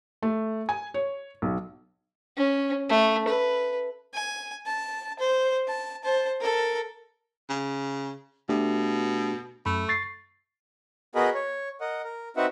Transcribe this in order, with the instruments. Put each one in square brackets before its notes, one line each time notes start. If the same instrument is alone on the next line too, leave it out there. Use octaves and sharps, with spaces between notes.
[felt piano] A3
G#5
C#5
B1
[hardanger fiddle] C#4
A3
B4
[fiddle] G#5
A5
C5
A5
C5 A5
A4 A#4
[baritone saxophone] C#3
[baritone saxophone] B2 [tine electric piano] A3 D4 G4
[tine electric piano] F#2 B5 [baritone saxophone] A3
[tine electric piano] C#6 A6 C7
[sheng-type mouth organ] B3 F#4 G#4 A#4 D#5 B5
C#5
A#4 D#5 F#5
A#4
C4 D#4 F#4 B4 E5 F#5